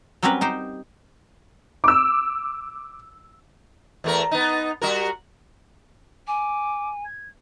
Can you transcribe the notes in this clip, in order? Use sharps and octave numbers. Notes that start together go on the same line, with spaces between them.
F#3 G3 C4 C#4 A#4 B4
D#4 G4 C5
D6 E6
E2 A3 A#4
B3 D#4
G3 F#4 A#4
G#5 D6
G#6